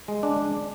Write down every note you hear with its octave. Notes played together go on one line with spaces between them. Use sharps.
G#3
D4